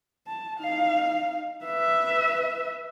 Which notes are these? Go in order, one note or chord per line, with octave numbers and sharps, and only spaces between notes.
A5
D#4 F5
B4 E5